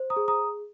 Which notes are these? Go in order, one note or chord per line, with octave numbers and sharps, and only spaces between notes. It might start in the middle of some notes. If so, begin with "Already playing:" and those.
Already playing: C5
A#5 D#6
G#4
A#5 D#6